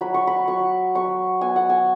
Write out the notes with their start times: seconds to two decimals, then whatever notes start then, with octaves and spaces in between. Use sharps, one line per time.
0.01 F#3 B5
0.14 C#6
0.27 B5
0.47 F#3 C#6
0.95 F#3 C#6
1.41 B3 G#5
1.56 F#5
1.69 G#5